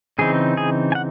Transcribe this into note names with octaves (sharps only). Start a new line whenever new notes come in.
C#3 E3 C4 D#4 G#4
G#4
G#5
F#5